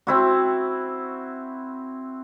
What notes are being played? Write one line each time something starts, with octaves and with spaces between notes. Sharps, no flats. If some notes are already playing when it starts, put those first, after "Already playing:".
C4 E4 F#4